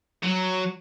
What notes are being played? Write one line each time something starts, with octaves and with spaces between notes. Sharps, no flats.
F#3